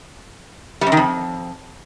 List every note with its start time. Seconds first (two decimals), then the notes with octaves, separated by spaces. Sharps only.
0.81 G3
0.87 F#2
0.92 D#3
0.97 F2